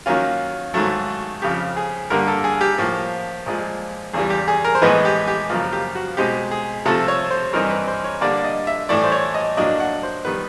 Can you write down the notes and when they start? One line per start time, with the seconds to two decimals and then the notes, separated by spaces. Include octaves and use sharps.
0.06 D#3 F#3 A#3 C#4 F4
0.74 G#2 D#3 F#3 A3
1.42 F2 C#3 F3 G4
1.77 G#4
2.10 G2 D3 G3 A#3 A#4
2.28 A4
2.44 G#4
2.61 G4
2.78 A2 F3 A#3
3.46 A#2 F3 G#3
4.13 E2 C#3 E3 G3 G#4
4.30 G4
4.48 G#4
4.65 A#4
4.75 C5
4.82 A2 E3 G#3 B3 D#4 B4
5.05 G4
5.28 G4
5.50 F#2 C#3 F3 A#3 F4
5.73 G4
5.95 F#4
6.17 B2 G#3 C4 D#4 G4
6.51 G#4
6.85 C3 F3 A3 A4
7.08 C#5
7.31 C5
7.53 G2 E3 G3 C4 D#4 A#4
7.70 B4
7.88 C5
8.04 C#5
8.21 D3 G3 A#3 D4 D5
8.44 D#5
8.67 E5
8.89 A2 E3 A3 D5
9.04 C5
9.12 C#5
9.34 D#5
9.57 A2 F#3 A#3 D4 D#5
9.80 F#5
10.03 C5
10.25 D#3 G3 B3 B4